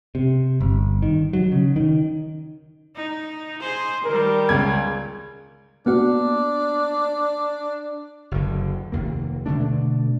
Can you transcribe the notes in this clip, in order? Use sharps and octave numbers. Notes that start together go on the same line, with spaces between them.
C3
G1
D#3
F#3
C#3
D#3
D#4
G#4 C5
D#3 G3 A#4
C#2 G#6
A#3 B3 D4 F#4
F#1 D3
F1 D#2 A#3
B2 D3 A3 D4